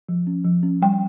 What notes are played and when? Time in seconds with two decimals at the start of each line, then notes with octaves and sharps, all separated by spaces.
0.09 F3
0.27 C#4
0.44 F3
0.63 C#4
0.82 G3 G5